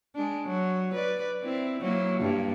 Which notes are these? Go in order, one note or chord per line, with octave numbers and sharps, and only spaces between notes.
G#3 D4
F#3
B4 D5
C4 E4
F#3 A#3 E4
G2 G3 A#3